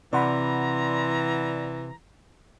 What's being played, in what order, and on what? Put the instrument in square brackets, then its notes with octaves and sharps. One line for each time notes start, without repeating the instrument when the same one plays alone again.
[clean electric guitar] C3 [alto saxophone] E3 [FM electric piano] D5 F#5 B5 [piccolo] A#5